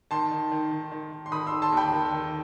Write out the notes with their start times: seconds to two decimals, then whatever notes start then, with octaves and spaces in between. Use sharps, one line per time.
0.11 D#3 A5 C6
0.31 D#3
0.52 D#3
0.71 D#3
0.92 D#3
1.12 D#3
1.26 C6
1.32 D#3 B5 D#6
1.47 C6 E6
1.52 D#3
1.62 A5 C6
1.72 D#2 G5 B5
1.93 D#3
2.12 D#3